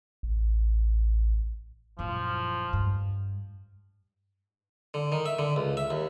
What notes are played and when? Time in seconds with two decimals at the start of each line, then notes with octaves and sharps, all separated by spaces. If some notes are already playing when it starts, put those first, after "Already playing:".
0.23 A1
1.99 F#1 A#2 F3
2.73 G2
4.94 D3
5.12 D#3
5.26 E5
5.39 D3
5.56 C#2
5.77 E5
5.90 D#2